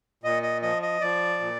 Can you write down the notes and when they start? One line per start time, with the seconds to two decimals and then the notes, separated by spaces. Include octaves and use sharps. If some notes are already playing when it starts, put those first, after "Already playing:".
0.24 A#2 D#5
0.43 D#5
0.62 F3 D#5
0.82 D#5
1.01 F3 D5
1.40 A#2